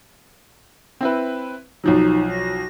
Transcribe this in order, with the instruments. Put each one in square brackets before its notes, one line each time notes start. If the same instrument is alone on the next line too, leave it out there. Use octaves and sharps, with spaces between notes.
[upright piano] C4 E4 B4
[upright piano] B1 F3 F#3 [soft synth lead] D#4
[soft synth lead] A#6